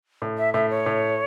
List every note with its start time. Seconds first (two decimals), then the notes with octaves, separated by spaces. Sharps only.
0.22 A2
0.38 E5
0.54 A2 E5
0.70 C#5
0.86 A2